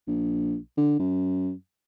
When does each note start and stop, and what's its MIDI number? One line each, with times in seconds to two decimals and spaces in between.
0.07 0.56 34
0.77 0.96 50
0.99 1.52 42